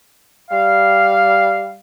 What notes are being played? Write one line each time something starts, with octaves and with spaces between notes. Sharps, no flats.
G3 F5